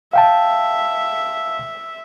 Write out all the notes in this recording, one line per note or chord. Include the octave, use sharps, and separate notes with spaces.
E5 F5 G5 A5